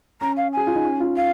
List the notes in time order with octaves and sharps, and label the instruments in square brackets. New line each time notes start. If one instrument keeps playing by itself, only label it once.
[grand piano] C#4 [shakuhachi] A#5
[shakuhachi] F5
[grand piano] G#4 [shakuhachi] G#5
[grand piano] F4
D#4
C#4
F4
[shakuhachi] F5